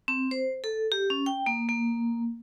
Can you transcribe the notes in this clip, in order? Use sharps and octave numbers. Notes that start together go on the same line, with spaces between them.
C4
C5
A4
G4
C#4
G5
A#3
A#3